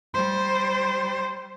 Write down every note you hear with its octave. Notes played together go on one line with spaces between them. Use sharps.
G3 C5